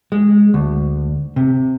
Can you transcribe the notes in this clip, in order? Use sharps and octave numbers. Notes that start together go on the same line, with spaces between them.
G#3
D2
C3